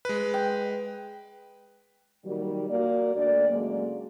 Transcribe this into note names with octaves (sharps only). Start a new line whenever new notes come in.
G#3 B4
G5
A#2 D#3 F#3 G3
A#3 F#4 D5
D2 D5
C#3 F#3 G#3 A#3